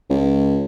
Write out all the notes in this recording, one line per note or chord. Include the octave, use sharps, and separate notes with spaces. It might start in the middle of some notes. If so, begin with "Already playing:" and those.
C#2